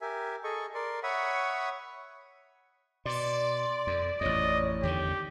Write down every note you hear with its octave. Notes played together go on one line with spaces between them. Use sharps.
G4 A#4 E5 G#5
G#4 A4 D#5 C#6
A#4 D5 C6
C#5 E5 F#5 B5 C#6 D#6
B2 D5 C6
F2
A1 F2 C#5 D#5
E2 D3 D#3 G4